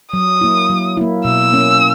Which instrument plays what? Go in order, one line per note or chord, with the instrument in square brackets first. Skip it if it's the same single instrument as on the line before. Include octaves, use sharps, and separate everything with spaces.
[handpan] F#3 [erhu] D#6
[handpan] A#3 E4
F#3
A#3 E4
[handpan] B2 [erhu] E6
[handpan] A#3 C#4